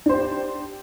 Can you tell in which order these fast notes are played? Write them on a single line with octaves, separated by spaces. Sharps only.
D4 C5 G4